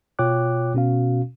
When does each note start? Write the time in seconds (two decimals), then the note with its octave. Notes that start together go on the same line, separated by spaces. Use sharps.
0.19 B2 F4 C#5 G5 D6 F#6
0.74 B2 C#4 F#4 F5